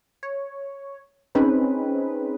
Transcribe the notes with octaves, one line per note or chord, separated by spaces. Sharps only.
C#5
C4 C#4 D#4 G#4 B4